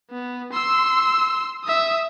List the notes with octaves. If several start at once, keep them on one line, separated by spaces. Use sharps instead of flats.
B3
C6 E6
E5 D#6